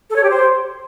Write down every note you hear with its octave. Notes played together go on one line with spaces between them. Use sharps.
A4
C#5
G4
C5